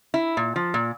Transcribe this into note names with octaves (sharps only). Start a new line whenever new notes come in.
E4
A#2
F3
A#2